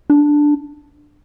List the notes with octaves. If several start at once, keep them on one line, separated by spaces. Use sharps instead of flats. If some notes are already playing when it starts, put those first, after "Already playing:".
D4